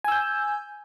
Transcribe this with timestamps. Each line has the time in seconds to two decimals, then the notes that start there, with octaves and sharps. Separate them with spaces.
0.04 G#5
0.08 E6
0.12 G6